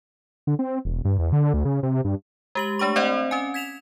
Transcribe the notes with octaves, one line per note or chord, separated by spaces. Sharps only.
D3
C4
E1
G2
E2
D3
D2
C#3
C3
G2
G#3 G4 F#7
A3 D4 G4 C#6
C4 C5 D5 D#5 F#5
C#4 G#5
G#6 B6 E7 F7